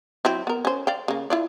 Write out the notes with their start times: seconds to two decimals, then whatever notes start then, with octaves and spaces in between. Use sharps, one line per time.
0.25 F#3 C4 E4
0.47 B3 A#4
0.65 C#4 C5
0.87 D5 F5 G5
1.08 C#3 A#3
1.30 E4 F4 D5